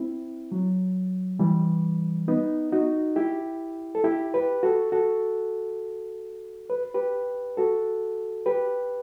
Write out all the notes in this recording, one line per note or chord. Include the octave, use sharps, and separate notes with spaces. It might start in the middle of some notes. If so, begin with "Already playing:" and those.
Already playing: C4 E4
F#3
E3 G3
B3 D#4
D#4 F#4
E4 G4
A4
E4 G4
G4 B4
F#4 A4
F#4 A4
B4
G4 B4
F#4 A4
G4 B4